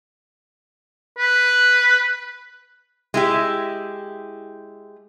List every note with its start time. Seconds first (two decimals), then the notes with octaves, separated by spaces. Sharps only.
1.18 B4
3.14 G#3 E4 G4